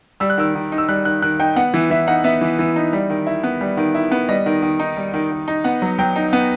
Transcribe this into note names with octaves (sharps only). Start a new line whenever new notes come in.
G3 E6
F#6
D#3 E6
D#3
D#4
E6
G3 F#6
D#3 F#6
D#3 F#6
D#4 G5
B3 F#5
E3
E3 E5
D#4 F#5
B3 E5
E3
E3
D#4
G3
D#3
E4
B3
G3
D#3
E4
B3
G3 D#5
D#3
D#3
D#4
G3
D#3
D#3
D#4
B3 F#5
F#3
F#3 G5
D#4
B3